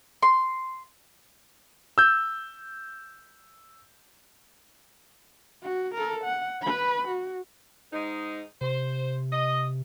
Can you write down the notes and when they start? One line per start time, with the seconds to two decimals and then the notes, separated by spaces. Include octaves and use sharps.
0.23 C6
1.98 E6 G6
5.63 F#4
5.94 A4 A#4
6.23 F#5
6.61 B4 B5
7.07 F#4
7.92 G#2 G#3 D#4
8.61 C3 C5
9.31 D#5